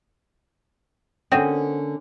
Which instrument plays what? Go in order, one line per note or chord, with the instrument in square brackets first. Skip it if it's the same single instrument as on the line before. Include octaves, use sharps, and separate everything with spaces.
[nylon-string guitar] D3 A#3 C#4 [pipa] C4 F#4 G#4